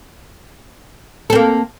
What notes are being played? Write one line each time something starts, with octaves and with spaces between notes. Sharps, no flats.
A#3 C4 A4